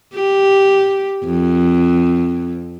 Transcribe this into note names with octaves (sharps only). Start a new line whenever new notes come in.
G4
F2